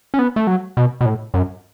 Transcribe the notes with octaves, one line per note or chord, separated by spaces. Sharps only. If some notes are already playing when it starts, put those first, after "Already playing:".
C#4
B3
A3
F#3
B2
B2
A2
F#2